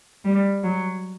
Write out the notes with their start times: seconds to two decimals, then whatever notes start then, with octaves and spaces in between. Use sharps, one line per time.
0.25 G3
0.63 F#3